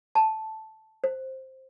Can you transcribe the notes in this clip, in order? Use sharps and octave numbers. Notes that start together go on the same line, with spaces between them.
A5
C5